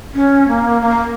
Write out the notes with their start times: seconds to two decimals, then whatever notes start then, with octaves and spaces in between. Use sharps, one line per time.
0.15 C#4
0.48 A#3
0.81 A#3